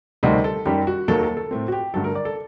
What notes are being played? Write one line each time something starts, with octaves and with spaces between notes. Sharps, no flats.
D2 C3 D#3 G3 C4 D#5
A4
F#2 D#3 G3 G4
F#4
D#2 D#3 F#3 A#3 A4
A4
A4
A2 A3 C4
F#4
G4
G2 D3 F#3 A3 A4
A#4
D5
A4